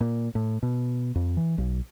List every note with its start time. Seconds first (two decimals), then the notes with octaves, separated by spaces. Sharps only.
0.01 A#2
0.35 A2
0.63 B2
1.15 F2
1.37 E3
1.58 B1